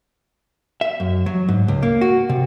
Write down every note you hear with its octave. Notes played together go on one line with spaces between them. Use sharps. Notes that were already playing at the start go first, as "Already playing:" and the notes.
E5
F#2
F#3
G#2
C#2
A#3
F#4
C3